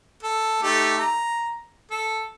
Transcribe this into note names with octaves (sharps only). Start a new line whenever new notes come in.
A4
A3 D#4 G4
A#5
A4